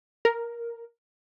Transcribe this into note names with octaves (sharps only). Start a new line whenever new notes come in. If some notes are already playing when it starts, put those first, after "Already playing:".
A#4